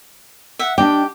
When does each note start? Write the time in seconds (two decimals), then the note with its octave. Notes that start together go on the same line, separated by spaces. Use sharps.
0.59 E5 F#5
0.78 D4 G4 D#5 G5